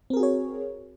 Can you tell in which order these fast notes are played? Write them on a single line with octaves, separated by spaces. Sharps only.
C4 A#4 G#4 F#4 C#5